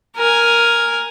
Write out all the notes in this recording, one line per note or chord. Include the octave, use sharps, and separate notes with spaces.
A#4 G#5